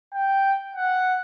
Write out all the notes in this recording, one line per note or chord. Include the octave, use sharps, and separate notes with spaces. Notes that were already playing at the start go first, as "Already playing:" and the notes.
G5
F#5